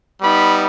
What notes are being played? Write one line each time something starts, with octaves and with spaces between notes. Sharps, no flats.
G3 B3 D#4 B5